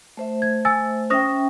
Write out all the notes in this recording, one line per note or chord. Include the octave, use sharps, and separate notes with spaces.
A3 C5 E5
G#6
G#5 E6 A6
C#4 C5 E5 G5 D#6 A#6